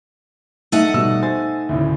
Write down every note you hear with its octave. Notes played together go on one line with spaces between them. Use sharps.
A3 D#4 F#5
B2 G3 E6
C5 G#5 A6
D2 A2 C#3